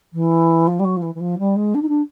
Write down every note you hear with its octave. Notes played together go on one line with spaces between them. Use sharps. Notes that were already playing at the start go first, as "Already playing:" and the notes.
E3
F3
G3
F#3
F3
E3
E3
F3
G3
G#3
D4
D#4
D4